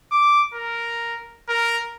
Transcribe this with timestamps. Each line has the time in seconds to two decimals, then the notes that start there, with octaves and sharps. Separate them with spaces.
0.12 D6
0.54 A#4
1.49 A#4